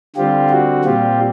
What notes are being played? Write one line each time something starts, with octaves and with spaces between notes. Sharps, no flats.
D3 G3 C4 F4 G4
F#4
A#2 G3 C4 F4 G4